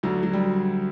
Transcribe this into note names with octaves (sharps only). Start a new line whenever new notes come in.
D2 D3 F#3
F#3
G3